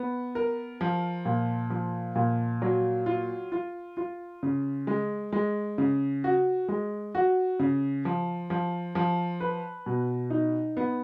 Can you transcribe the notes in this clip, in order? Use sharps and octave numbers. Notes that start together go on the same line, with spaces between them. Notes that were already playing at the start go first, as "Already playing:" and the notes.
Already playing: B3
A#4
F3
A#2
F3
A#2
F#3
F4
F4
F4
C#3
G#3
G#3
C#3
F#4
G#3
F#4
C#3
F3
F3
F3
B4
B2
D#4
B3